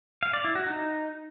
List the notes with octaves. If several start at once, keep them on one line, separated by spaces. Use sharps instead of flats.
F5
D5
E4
F#4
D#4